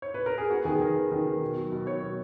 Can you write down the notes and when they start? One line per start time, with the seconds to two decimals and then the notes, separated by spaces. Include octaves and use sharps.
0.02 C#5
0.14 B4
0.26 A#4
0.38 G#4
0.50 B3 F#4
0.65 D#3 G#4
0.80 D#3 A#4
0.95 B3
1.11 D#3
1.26 D#3
1.41 B2
1.57 F#3
1.72 B2
1.87 F#3 C#5
2.03 B2